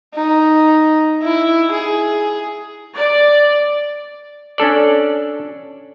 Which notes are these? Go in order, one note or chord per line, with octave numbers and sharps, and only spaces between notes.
D#4
E4
G#4
D5
C#4 D4 A4 D5